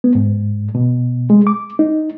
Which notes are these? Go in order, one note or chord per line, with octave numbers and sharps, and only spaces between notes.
B3
G#2
B2
G#3
D6
D#4